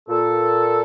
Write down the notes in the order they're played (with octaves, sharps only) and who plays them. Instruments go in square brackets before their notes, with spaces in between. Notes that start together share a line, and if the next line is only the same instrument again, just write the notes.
[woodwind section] A#2 A4